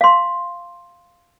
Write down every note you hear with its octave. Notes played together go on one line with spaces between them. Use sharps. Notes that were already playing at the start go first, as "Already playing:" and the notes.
F5 C6